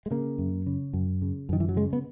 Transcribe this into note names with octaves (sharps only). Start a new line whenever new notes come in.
G#3
C#3 A#3
F#2
C#3
F#2
C#3
F#2 D#3
E3
F#3
C#3 G#3
B3